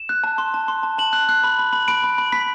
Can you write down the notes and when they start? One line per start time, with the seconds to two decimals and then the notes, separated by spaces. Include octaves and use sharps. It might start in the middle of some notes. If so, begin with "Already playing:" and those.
Already playing: E7
0.09 F#6
0.24 A5
0.38 C6
0.54 A5
0.68 C6
0.83 A5
0.98 A5 F#7
1.13 F#6
1.29 F#6
1.44 B5
1.59 B5
1.73 B5
1.88 B5 D7
2.04 B5
2.18 B5
2.32 B5 B6